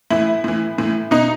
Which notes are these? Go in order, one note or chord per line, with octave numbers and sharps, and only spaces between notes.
A2 E3 E4
A2 E3
A2 E3
B2 D#4